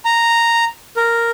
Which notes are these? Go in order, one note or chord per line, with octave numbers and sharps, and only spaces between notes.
A#5
A#4